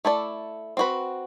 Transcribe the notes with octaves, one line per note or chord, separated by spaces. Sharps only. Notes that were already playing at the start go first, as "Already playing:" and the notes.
A3 E4 A4 D5
C4 F#4 B4